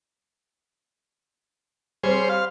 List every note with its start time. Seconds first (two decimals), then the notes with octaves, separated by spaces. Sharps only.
2.03 G3 C4 G#4 C5 C#5
2.29 F5